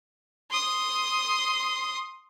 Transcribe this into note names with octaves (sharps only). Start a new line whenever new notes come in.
C6 D#6